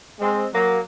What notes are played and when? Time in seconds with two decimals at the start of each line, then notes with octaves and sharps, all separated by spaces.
0.19 G#3 C4
0.53 F#3 A#3